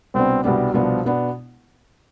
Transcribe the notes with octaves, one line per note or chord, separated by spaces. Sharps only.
C2 B2 B3 C4 D4
C2 B2 G3 B3 D4
C2 B2 F3 B3 D4
B2 B3 D4